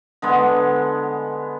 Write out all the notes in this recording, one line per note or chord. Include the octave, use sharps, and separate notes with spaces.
D3 G#3 B3